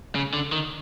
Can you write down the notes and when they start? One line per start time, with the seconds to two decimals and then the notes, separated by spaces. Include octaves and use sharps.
0.16 C#3
0.34 D3
0.52 D#3